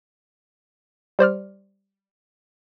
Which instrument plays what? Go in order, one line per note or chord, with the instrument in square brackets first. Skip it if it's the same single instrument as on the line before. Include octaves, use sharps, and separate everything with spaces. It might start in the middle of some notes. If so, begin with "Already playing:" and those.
[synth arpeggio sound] G3 C5 D5 F6